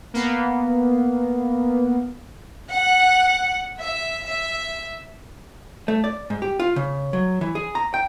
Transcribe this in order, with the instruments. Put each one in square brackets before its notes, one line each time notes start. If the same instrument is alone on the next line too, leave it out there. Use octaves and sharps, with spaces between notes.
[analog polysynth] A#3 B3
[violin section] F#5
E5
E5
[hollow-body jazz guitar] A3
D5
G#2
G4
F4
C#3
F#3
E3
G#4
A#5
G5